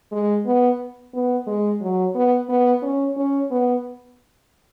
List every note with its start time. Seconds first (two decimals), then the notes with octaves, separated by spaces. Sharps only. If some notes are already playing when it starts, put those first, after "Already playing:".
0.12 G#3
0.46 B3
1.14 B3
1.47 G#3
1.81 F#3
2.15 B3
2.49 B3
2.82 C#4
3.16 C#4
3.51 B3